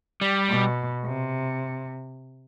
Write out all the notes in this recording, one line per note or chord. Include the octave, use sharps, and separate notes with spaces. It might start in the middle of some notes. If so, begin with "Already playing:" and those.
G3
B2
C3